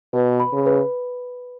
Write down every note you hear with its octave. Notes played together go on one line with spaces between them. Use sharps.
B2 B4
B5
C#3
B4